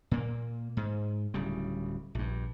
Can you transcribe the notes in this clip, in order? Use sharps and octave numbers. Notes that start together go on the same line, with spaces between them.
A#2 A#3
G#2
D1 C#3 G3
A#1 G2